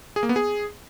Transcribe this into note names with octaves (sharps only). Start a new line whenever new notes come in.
G#4
A#3
B3
G#4